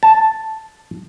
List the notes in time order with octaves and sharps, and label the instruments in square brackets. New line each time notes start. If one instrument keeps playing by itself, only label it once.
[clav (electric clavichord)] A5